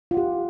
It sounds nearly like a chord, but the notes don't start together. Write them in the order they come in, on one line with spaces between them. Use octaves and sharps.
F4 F#5 G4